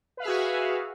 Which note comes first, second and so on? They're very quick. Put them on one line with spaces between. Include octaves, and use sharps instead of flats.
B4 F5 E5 G#4 F#4